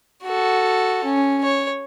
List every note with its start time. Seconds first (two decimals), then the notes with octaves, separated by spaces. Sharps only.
0.24 F#4 A4
1.04 C#4
1.43 C#5